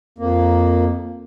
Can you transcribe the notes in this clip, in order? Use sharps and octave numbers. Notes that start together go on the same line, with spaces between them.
F2 A#3